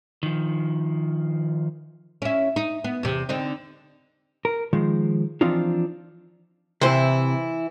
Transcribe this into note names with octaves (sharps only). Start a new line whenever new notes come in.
D#3 F3
C#4 E4
D#4
B3
E2 C3
D3 C4 D#4
A#4
D#3 F3 G#3
E3 F3 C4 D4 D#4 F4
C3 E3 E4 C5